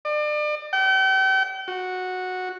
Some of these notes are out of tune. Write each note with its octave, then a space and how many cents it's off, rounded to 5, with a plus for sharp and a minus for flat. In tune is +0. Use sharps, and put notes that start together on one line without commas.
D5 +35
G5 -40
F#4 -10